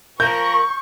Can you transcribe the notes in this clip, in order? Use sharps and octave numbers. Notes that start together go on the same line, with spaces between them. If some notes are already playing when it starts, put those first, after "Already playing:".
F3 A#4 C#6 G6